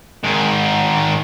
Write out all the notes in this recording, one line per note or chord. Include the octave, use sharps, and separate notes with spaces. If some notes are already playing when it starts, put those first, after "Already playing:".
G#2 D#3